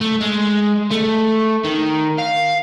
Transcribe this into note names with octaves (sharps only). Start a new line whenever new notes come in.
A3
G#3
A3
D#3
F5